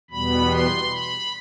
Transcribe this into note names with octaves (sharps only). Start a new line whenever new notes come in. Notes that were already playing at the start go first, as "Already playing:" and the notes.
E2 B2 G3 B3 B5
C6
B5